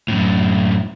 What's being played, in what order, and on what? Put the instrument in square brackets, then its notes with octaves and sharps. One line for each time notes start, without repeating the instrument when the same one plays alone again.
[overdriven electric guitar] F#2 A2